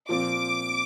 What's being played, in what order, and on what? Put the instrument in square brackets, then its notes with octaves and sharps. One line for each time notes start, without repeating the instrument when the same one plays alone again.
[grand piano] A#2 F3 C4 F4 [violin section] D6